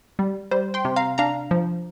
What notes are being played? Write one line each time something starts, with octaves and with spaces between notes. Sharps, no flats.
G3
G3 C5
G5 C6
C3
F5 A#5
D4 F5 A#5
F3